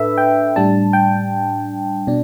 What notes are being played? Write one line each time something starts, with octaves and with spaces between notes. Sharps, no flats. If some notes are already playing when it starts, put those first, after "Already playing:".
Already playing: A2 D4 A4 B4 E5
G5
A2 G3 D4 A5
G5
B2 D4